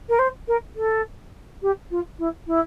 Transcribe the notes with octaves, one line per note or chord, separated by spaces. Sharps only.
A#4
C5
A#4
A4
G4
F4
E4
E4